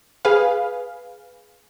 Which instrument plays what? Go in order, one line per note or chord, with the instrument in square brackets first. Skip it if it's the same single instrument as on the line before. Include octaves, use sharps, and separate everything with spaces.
[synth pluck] G#4 B4 F5